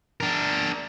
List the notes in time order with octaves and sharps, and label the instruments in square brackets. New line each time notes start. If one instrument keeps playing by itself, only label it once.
[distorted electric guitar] D4 A#4